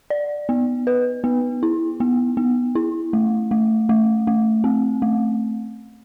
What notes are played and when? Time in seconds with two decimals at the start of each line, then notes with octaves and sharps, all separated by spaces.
0.10 D5
0.49 B3
0.87 B4
1.24 B3
1.63 E4
2.00 B3
2.37 B3
2.75 E4
3.13 A3
3.51 A3
3.89 A3
4.27 A3
4.64 C4
5.02 A3